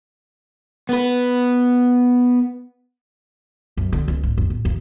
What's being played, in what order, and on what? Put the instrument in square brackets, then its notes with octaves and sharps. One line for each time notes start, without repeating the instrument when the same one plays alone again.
[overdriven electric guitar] B3 B4
[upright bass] F#2
D3
C#2
G#2
F2
A1
E2